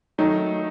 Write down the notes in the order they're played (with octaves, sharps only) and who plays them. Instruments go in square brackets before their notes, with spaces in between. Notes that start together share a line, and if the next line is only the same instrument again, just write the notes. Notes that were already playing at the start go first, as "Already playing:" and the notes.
[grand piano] D#3 F#3 A3 [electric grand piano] D#4